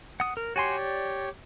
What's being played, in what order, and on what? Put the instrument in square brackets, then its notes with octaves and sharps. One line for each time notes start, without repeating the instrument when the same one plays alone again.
[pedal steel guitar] F#5 D#6
A#4
[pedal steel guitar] F#4 G#5 C6 [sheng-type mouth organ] G4 C#5
[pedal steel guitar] D5